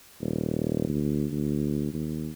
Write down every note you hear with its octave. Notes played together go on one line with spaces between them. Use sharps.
D#1
D2
D2
D#2